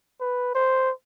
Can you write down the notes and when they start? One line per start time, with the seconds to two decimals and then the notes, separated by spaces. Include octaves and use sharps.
0.20 B4
0.55 C5